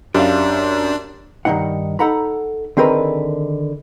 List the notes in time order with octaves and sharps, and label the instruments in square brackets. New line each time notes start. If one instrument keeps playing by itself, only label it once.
[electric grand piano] F#2 [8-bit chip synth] D4 [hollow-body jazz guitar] G4 E5 F5
[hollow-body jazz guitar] G2 D#3 G#3 A#3 D#4 F#5
D#4 A4 F#5 A#5 B5
D3 D#3 C4 G#4 A#4 B4